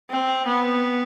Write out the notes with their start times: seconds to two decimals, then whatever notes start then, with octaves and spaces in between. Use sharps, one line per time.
0.10 C4
0.46 B3